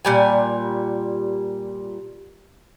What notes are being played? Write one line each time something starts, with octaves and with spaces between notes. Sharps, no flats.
A#2 G3 G#5